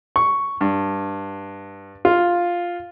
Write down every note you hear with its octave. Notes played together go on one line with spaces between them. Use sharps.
C#6
G2
F4